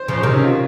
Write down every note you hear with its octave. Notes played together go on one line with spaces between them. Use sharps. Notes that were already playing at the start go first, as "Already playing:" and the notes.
Already playing: C5
C#3 F3
C5
C3 D#3 A#4
C#4
F4